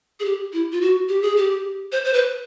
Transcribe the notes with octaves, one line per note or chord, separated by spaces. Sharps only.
G#4
G4
E4
F4
F#4
G4
G#4
G4
C5
C5
B4